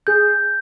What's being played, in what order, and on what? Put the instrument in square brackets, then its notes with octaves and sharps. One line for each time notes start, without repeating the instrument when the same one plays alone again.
[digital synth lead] G#4 [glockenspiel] G6